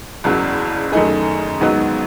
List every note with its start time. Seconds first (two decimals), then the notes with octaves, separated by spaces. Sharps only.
0.24 F#1 E2 C#3 F#3
0.92 F#2 D#3 A3 D#4 G#4
1.60 G#1 G#2 F#3 B3 D#4